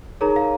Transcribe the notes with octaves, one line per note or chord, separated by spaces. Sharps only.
D#4 G#4 A#4 C#5 A#5
F5